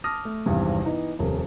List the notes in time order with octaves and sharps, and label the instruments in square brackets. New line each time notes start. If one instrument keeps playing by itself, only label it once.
[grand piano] A5 D6 D#6 F6 A#6
A3
G#1 E2 G2 C3
E3 B3 D#4
D#1 F2 C3 A#4